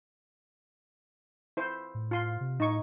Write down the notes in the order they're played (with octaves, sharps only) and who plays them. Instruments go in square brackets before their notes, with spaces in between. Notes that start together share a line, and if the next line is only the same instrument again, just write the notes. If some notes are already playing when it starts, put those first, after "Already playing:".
[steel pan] E4 C5
[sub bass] A2
[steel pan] F4 C6
[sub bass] C3
[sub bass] A2 [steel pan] D#4 C#6